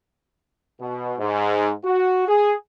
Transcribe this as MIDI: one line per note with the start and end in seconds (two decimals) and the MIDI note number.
0.81 1.14 47
1.19 1.72 44
1.85 2.26 66
2.28 2.54 68